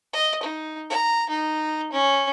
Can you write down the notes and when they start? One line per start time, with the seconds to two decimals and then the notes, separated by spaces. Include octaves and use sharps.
0.13 D#5
0.43 D#4
0.90 A#5
1.30 D#4
1.92 C#4